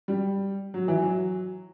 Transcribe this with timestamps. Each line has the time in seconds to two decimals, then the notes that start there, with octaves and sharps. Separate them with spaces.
0.08 G3
0.74 F#3
0.88 E3
1.02 F#3